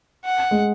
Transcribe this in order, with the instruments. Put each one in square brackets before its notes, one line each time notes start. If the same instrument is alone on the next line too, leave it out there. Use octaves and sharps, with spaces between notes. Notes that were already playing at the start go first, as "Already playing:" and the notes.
[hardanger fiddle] F#5
[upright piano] G#3